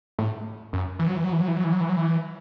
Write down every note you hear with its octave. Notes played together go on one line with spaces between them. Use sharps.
A2
F#2
E3
F#3
E3
F#3
E3
F#3
E3
F#3
E3
F#3
E3
F#3
E3